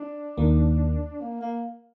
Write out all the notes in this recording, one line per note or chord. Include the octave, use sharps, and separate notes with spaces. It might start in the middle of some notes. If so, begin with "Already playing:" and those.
Already playing: D4
D#2 D#3 A#3
A#3
A#3